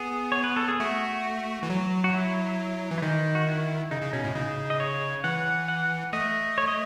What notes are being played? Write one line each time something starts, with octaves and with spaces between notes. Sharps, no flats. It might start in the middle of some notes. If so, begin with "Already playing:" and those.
Already playing: B3 G#4
C#5
B4
A4
G#4
A3 F#4
E3
F#3
F#4
E4
E3
E4
D#3 D#4
F#4
E4
C#3 D#4
C#3
B2 C#4
A2
C#3 D#4
D#5
C#5
E3 F#5
F#5
A3 D#5
C#5
D#5